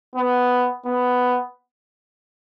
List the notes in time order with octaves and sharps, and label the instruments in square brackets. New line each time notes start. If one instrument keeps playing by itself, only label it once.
[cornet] B3
B3